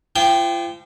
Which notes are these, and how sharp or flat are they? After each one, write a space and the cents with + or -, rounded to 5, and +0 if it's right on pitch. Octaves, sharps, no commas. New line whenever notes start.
F3 -35 G5 +0